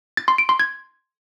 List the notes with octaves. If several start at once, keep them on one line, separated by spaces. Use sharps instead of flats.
A6
C6
D7
C6
G#6